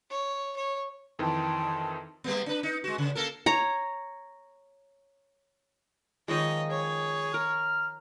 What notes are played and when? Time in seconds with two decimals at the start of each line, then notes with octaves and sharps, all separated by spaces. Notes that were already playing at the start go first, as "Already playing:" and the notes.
0.10 C#5
0.56 C#5
1.19 F2 D#3 E3 G5 A5 C6
2.24 G3 A#3 B3
2.46 D4 B4
2.63 D#4
2.84 G#3 F#4
2.98 C#3
3.15 A#3 A4 A#4
3.46 C#5 A#5
6.28 D#3 F3 G#3 C#5 D#5
6.70 G#4 C#5
7.34 A#4 F6